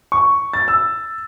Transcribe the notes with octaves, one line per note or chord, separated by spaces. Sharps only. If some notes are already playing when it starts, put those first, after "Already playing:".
C#6
A6
E6